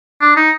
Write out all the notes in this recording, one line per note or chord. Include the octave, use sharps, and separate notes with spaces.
D4
D#4